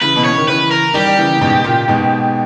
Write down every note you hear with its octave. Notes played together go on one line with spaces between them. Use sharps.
C#3 E3 B4
B2
C#3 C#5
D#3
C#3 E3 B4
A#4
D#3 G3 G4
G3
C#3 E3
C#3
G#2 B2
A#2 C#3
G#2 B2